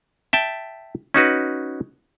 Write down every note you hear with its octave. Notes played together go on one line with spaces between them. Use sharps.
E5 G5 A5
C#4 D#4 F#4 B4